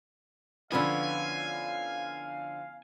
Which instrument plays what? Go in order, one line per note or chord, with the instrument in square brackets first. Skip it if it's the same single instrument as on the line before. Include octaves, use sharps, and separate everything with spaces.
[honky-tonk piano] D3 F3 [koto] B3 C#4 E4 [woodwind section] F5 [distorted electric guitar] G#5